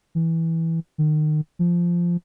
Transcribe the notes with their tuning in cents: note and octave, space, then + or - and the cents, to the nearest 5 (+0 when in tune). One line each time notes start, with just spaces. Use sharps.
E3 -10
D#3 -30
F3 -10